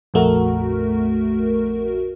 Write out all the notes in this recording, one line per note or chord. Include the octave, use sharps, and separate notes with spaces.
A#1 F2 A3 F#4 A#4